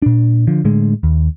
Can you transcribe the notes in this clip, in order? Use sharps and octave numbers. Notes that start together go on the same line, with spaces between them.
A#2 D4
D3 F3
A2 D3 G#3
D#2